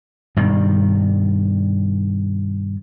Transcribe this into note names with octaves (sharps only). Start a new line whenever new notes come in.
G2 B2 D#3